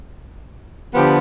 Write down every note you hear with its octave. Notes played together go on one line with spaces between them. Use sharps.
D3 F3 B3 G4